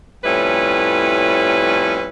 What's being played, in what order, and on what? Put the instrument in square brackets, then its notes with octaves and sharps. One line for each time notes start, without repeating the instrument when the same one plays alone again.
[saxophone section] F2 A2 G3 C#4 E4 B4